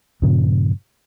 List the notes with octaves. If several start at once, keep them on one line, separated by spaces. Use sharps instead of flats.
G2 A#2 C#3 F3